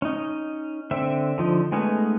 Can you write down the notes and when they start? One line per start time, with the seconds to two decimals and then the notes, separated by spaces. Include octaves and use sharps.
0.02 C#4 D#4
0.91 D3 C4 E5
1.38 D3 F3 D#4
1.72 G#3 A3 B3 C#4 D#4